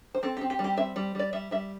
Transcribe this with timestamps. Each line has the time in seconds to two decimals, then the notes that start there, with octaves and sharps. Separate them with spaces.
0.15 C5
0.23 C4 A4
0.37 G4
0.41 C4
0.50 G4
0.59 G3
0.64 G4
0.77 C4 E5
0.96 G3
1.15 G3 D5
1.33 G3 E5
1.51 G3 E5